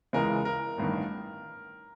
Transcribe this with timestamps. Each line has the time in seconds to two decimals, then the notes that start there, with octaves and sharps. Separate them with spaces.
0.13 C#2 C#3 E3 G#3 A#4
0.45 A#4
0.78 A1 G2 D#3